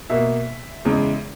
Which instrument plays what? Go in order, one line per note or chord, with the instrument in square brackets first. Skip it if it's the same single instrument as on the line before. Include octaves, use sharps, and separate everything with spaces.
[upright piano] B2 A#3 E5
E2 C#3 G#3